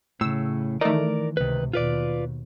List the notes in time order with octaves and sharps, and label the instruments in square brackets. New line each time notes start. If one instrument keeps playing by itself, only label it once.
[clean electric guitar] A2 [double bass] C#3 [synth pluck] E6
[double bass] D#3 E3 [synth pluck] A3 D#4 [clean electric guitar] A#4 D5
[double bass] C#2 C3 [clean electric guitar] D#3 B4
[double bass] D#2 B2 [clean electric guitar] F4 B4 D5